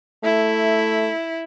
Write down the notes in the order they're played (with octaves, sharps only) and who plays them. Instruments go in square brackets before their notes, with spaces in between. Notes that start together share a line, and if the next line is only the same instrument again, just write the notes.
[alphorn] A3 [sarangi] E4